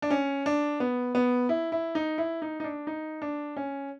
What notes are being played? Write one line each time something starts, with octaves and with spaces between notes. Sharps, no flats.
D4
C#4
D4
B3
B3
E4
E4
D#4
E4
D#4
D#4
D4
D#4
D4
C#4